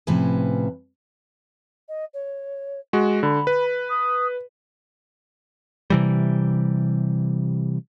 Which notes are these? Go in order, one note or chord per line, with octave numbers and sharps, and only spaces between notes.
A2 C3 F3 C#4 B4 G#5
D#5
C#5
G#3 F#4
D3 B5
B4
D#6
C3 E3 G3